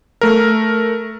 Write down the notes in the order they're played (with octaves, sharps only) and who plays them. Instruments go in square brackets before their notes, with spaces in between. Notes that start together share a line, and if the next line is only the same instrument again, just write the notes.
[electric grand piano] A3 A#4